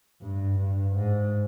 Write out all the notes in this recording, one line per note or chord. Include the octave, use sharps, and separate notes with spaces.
G2
G2
G#2